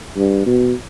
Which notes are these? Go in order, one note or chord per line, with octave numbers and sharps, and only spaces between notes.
G2
B2